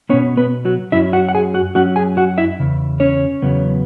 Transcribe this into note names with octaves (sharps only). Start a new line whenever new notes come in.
B2 B3 C#4 C#5
B3 B4
F#3 F#4
F#2 F#3 C#4 E4 E5
F#4 F#5
F#5
G#4 G#5
F#4 F#5
F#2 F#3 C#4 F#4 F#5
G#4 G#5
F#4 F#5
E4 E5
E2 C#3
C#4 C#5
E2 C#3 F#3 B3